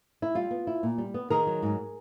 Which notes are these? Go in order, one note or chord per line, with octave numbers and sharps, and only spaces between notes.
E4
G3 F4
B3
E4
A#2
G3
B3
D#3 G#4 A#4
F#3
G#2